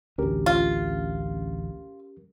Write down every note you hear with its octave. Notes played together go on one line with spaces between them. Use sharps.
A1 D2 C#4 G4 A#4
F4